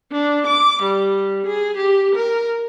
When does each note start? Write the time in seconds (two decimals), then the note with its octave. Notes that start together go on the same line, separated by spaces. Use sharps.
0.12 D4
0.47 D6
0.82 G3
1.46 G#4
1.77 G4
2.15 A#4